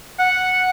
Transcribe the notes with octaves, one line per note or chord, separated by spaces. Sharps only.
F#5